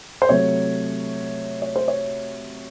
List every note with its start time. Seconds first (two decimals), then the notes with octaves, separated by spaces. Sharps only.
0.22 C5
0.29 C3 F#3 A3 C#5
1.62 C#5
1.76 C5
1.88 C#5